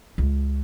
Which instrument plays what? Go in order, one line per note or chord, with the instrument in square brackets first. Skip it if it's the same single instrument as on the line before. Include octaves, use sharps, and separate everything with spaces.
[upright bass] C#2